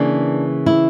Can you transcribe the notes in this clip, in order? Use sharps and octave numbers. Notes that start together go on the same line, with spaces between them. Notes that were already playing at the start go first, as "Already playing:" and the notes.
Already playing: C#3 E3 A#3 D4
E4